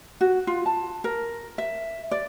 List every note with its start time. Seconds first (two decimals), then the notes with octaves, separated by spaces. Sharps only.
0.21 F#4
0.47 F4
0.66 A5
1.04 A#4
1.58 E5
2.11 D5